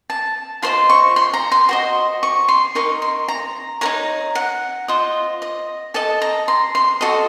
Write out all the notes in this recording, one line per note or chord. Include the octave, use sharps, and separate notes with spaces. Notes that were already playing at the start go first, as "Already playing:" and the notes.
A5
F4 C5 D#5 C6
C#6
C6
A#5
C6
F#4 C5 D#5
C#6
C6
D#4 A#4 D#5 C#6
C6
A#5
D#4 A#4 C#5 A#5
F#5
F4 C5 D#5
D#5
A4 D#5 A5
A#5
C6
C6
F#4 A4 D#5 D#6